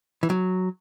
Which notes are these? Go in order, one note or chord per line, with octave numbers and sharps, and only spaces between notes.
E3
F#3